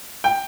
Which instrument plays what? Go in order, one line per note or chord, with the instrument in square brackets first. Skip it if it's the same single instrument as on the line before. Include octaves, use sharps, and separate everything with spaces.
[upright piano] G5